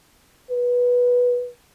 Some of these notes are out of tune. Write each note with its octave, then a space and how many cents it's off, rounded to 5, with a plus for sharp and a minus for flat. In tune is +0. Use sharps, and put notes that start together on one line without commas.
B4 -10